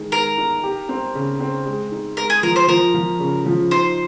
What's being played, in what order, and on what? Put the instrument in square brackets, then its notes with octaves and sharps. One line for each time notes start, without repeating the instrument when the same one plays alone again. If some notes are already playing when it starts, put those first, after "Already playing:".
Already playing: [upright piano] D#3 G#3
[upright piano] G#3 [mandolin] A#4
[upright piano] D#4
G4
C4
C#3
C4
G#3
D#4
[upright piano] G#3 [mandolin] A#4
[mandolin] G#4
[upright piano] F3 [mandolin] A#4
[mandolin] C5
[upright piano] F3 [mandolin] A#4
[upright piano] F3
C#3
F3
[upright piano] D#4 [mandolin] C5